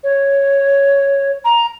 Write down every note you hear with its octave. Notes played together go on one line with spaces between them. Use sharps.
C#5
A#5